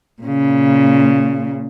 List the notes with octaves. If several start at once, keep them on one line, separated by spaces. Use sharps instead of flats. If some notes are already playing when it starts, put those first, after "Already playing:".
A#2 C#3